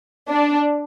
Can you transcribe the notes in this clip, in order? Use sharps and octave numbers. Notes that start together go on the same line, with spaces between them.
D4